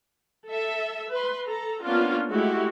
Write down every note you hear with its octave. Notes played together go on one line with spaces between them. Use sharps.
A4 E5
B4 C6
A4 A#5
A#3 B3 C#4 D4 F4
G#3 A3 E4 F#4 G4